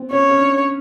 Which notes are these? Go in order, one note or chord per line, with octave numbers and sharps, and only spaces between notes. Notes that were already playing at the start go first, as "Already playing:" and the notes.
Already playing: B3 C4
C#4 C#5
C#4
D4